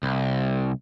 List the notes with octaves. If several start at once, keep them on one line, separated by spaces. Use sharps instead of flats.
C2